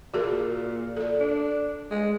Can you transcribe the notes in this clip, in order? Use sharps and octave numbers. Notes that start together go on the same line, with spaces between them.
A#2 F#4 G#4 A#4
A4 D5
D4
G#3